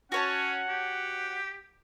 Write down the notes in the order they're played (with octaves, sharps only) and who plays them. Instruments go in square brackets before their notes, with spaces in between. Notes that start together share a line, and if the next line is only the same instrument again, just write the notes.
[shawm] C#4 [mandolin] F#4 C#5 A5 [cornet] F#5
[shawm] G4